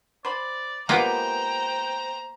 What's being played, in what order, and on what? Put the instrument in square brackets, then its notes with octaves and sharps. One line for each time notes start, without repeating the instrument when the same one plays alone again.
[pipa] C5 B5 [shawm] D5
[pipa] G#3 F4 G4 [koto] A#3 B3 [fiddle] C5 A#5 [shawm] G5